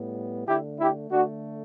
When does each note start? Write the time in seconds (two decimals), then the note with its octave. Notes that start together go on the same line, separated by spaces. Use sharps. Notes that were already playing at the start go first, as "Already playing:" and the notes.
Already playing: A2 G3 B3
0.46 D3 A3 E4 G4
0.78 E4 G4
1.11 D3 A3 D4 F#4